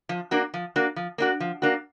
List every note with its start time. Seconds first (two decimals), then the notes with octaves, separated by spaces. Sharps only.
0.09 F3
0.31 A#3 D4 F#4
0.54 F3
0.76 A#3 D4 F#4
0.96 F3
1.18 A#3 D4 F#4
1.40 F3
1.62 A#3 D4 F#4